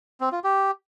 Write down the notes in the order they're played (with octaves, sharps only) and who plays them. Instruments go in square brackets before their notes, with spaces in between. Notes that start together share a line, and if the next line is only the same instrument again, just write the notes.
[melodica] C4
F4
G4